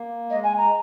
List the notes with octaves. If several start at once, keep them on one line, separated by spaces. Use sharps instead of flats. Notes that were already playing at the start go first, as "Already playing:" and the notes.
Already playing: A#3
G#3 D#5
G#5
A#5